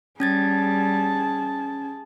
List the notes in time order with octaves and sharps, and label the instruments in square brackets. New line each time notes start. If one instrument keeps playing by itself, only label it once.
[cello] G3 [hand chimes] C#4 G#6 A6 [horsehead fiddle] G#4 A5